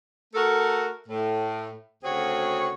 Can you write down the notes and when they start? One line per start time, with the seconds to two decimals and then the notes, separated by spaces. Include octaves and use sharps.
0.34 A3 F#4 A4 A#4
1.08 A2
2.03 D2 C#3 C4 F#4 G#4 C#5